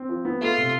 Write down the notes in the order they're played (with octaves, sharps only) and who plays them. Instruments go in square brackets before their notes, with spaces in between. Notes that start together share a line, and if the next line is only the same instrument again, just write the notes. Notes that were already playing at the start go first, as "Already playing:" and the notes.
Already playing: [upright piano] C4
F3
B3
[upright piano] A3 [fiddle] F4
[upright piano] C3